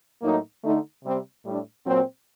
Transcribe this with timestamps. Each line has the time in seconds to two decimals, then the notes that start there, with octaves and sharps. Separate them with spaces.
0.21 A2 F#3 A#3 D#4
0.62 D3 A3 D#4
1.02 C3 G3 C4
1.44 A2 G3 D4
1.85 A#2 F#3 C4